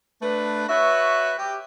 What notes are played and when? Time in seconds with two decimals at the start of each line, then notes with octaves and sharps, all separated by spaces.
0.22 A3 D4 B4
0.69 F#4 B4 C#5 E5
1.39 G4